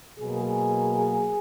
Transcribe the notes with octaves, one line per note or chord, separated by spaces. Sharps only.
B2 F#3 A#3 G#4